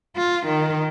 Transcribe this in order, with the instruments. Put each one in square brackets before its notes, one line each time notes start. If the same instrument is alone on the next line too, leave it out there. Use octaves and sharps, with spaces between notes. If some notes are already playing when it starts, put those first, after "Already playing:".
[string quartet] F4
D#3